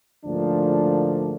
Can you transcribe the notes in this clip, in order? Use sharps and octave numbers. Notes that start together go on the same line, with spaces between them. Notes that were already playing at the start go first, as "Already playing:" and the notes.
D2 G#2 F3 A3 A#3 D4